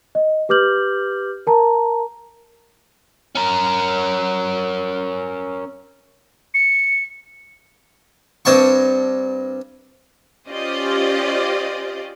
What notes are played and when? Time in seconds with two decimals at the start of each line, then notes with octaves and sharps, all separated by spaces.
0.15 D#5
0.49 G4 B4 D6 F6 G6 F#7
1.47 A#4 A5 A#5
3.35 C#4 A#4
6.54 C#7
8.45 G2 C4 A5 C#6
10.47 C#4 F4 G4 C5 D5 D#5